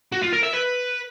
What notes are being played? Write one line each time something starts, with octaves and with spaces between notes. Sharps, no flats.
F#4
F4
A#4
E5
B4